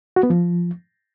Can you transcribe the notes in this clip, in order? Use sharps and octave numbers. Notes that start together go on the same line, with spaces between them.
F#4
B3
F3